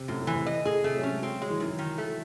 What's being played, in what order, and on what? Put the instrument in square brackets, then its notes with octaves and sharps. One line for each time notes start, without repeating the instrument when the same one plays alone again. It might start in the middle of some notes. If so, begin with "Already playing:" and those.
Already playing: [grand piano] C3
[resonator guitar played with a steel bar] F#2 [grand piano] A2
[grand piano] A2
[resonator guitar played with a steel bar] E3
[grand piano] C3
[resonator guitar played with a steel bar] D#5
[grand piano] A2 [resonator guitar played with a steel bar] G#4
[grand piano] C3 [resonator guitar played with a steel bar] A3
[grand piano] F#3
[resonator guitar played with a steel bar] C#4
[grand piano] G#3
[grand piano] F#3 [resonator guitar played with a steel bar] C4
[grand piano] F#3 [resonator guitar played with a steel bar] G#3
[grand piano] E3
[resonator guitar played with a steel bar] F#2 [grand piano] D#3
[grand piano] E3
[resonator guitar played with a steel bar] D#3
A3